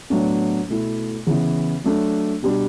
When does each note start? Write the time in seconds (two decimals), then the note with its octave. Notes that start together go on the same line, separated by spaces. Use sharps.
0.10 A2 F#3 B3 D4
0.68 B2 A3 E4
1.26 C#3 E3 B3 E4
1.84 F#3 A3 D4
2.42 B2 G3 D4